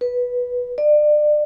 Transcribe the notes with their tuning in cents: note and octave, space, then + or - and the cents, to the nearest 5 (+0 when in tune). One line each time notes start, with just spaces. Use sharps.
B4 -10
D5 +30